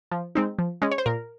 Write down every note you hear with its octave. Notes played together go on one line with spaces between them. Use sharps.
F3
G#3 C4 D#4
F3
G#3 C#4
C#5
C5
A#2 A#4